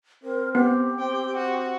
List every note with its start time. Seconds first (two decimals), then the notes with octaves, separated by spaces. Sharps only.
0.23 C4 A#4
0.55 B3 G4
0.99 C4 G5
1.37 F#4